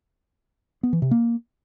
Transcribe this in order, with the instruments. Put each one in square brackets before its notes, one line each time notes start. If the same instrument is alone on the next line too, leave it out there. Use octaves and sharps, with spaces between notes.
[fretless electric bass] B3
E3
C3
A#3